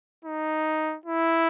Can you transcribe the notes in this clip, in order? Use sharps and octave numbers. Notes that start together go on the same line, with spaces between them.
D#4
E4